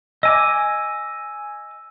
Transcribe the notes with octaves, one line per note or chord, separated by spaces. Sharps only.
D#5 G#5 D6 E6 D#7